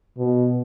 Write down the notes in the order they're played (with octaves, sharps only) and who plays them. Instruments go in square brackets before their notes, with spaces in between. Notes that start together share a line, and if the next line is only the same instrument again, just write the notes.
[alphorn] B2